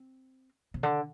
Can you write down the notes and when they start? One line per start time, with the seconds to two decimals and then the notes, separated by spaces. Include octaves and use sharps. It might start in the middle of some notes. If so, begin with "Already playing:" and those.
Already playing: C4
0.74 C3
0.83 D3